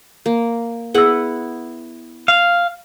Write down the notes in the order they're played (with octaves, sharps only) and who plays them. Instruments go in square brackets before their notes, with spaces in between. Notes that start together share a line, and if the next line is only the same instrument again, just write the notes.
[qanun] A#3
[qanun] B3 E4 F#5 [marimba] G#4 E6
[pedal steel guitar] F5